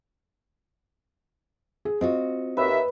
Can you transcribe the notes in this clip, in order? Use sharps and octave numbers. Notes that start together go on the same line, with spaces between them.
G#4
C4 F4 F#4 D#5
D#2 B4 E5